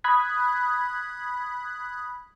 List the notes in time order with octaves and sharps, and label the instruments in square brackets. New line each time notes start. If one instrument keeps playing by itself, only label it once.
[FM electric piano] B5 D#6 F#6 G#6 B6